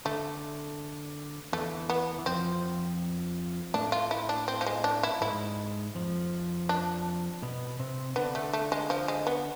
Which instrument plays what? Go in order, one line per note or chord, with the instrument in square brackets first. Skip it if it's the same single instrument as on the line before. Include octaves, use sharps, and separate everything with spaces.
[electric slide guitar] D3 [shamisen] A3
[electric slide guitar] E2 E3 [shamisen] A3
[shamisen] B3
[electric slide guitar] E3
[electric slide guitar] F2 F3 [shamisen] C4
[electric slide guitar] A2 A3 [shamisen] D4
[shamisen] F4
E4
D4
C4
F3
G#3
D4
E4
[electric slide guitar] G#2 G#3 [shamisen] E4
[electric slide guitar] F2 F3
[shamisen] D4
[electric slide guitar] B2 B3
C3 C4
[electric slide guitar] D3 D4 [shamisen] B3
[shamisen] A3
A3
G#3
F3
G#3
B3